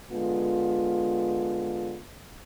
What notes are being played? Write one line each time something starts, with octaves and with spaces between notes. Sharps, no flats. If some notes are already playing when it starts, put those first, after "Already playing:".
D3 G#3 B3 F4